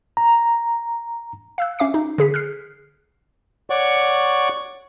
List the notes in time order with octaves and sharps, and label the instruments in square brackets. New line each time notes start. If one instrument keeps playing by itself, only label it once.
[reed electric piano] A#5
[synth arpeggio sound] F5 E6 F#6
C#4 E5 D6 C7
D#4
D3 G#4 B6
F6 F#6 C7
[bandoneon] C#5 D5 F#5 C#6